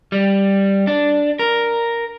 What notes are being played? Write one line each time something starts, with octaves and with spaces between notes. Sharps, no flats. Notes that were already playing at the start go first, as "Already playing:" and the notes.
G3
D4
A#4